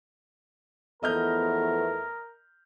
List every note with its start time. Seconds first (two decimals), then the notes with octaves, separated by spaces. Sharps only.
1.03 E2 F3 A3 B3 A#4 D#5 F6 G6